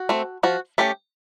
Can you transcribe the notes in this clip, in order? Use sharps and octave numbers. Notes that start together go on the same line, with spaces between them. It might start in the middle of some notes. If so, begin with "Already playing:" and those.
Already playing: F#4
A3 C4
F3 F#4
A3 C#4 G4